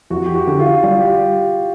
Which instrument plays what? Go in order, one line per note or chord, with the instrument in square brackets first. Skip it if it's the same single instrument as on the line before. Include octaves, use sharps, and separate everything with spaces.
[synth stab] F2 [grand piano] F#4
[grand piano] G4
F#4
[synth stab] D3
[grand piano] F4
[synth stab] G3 [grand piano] F4
[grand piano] G4